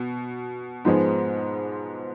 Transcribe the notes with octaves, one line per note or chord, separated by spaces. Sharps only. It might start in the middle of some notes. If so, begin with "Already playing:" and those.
Already playing: B2
G#2 F3 G#3 B3